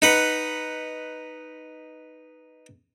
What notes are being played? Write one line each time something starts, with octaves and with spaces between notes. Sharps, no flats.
D#4 B4 F#5